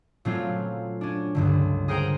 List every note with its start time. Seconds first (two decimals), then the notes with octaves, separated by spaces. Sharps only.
0.25 A#2 F#3 A3 C4 C#4 F4
1.01 C#4 D4
1.35 C#2 G2 D3
1.88 G#4 A#4 C5 F#5 G5 A#5